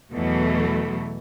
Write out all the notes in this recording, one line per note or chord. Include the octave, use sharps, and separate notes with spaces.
E2 B2 E3 F#3 A3